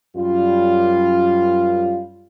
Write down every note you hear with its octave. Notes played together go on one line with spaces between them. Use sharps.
F#2 G3 F4